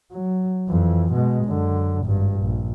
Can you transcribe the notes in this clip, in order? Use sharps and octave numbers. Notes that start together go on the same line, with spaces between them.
F#3
F2 E3
B2 G#3
F#2 D3
G#1 G2
A#1